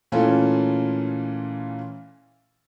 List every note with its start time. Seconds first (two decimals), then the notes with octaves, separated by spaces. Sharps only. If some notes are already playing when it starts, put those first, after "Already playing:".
0.12 A#2 E3 A3 C#4 F4 A4